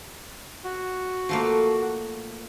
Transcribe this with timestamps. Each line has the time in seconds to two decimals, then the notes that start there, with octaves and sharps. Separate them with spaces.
0.64 F#4
1.29 F3 A3 A#3